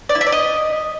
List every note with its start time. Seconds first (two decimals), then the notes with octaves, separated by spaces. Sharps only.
0.09 D5
0.15 E4
0.21 E5
0.27 D5
0.32 D#5